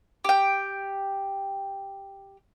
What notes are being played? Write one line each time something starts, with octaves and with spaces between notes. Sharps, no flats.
G4 G5